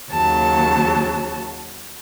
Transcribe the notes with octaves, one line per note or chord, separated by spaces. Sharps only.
D#2 C#3 F#3 A5